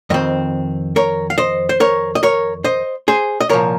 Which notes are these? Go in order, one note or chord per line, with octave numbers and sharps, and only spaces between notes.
F2 D#3 C4 D#5
A#4 C#5
F5
C5 D#5
C5
A#4 C#5
D#5
A#4 C#5
C5 D#5
G#4 C5
D#5
C2 A#2 F3 A#4 C#5